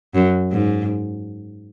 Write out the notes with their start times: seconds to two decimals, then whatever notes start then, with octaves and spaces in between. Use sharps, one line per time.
0.14 F#2
0.51 G#2